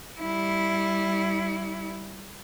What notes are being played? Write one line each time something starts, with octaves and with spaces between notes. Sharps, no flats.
G3 E4